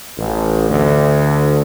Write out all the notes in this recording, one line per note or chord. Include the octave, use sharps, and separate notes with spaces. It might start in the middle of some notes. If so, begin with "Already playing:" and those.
A1
D2